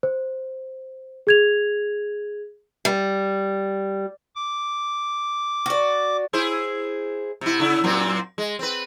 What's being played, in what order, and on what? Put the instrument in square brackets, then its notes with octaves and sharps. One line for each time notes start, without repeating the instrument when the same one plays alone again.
[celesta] C5
G#4 G#6 F7
[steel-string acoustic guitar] G3
[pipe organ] D6
[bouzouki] F#4 D5
[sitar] E4 G#4 C5
C3 E4
C#3 E4
F#2 A#2 C4
G#3
C4 B4